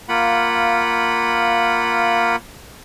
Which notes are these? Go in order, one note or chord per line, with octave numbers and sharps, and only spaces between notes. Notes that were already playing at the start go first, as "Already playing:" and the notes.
A#3 F4 F#5 B5